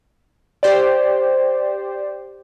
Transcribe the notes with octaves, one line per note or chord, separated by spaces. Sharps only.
G4 C5 D5